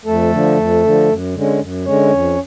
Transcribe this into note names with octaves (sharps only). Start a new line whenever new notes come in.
F2 A3 A4
D3 F3
F2
D3 F3
F#2
D3 G#3 C#4
F#2
D3 G#3 C#4 C#5
F2